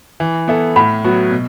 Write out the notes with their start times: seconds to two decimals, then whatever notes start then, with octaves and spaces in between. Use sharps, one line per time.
0.20 E3
0.48 B3 E4 A4
0.76 A2 F#5 B5
1.04 F#3 B3 F#4
1.31 B2